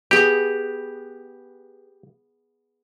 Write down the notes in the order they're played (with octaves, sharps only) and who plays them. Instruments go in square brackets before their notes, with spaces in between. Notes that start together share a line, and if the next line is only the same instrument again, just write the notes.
[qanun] B3 G#4 [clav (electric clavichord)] G4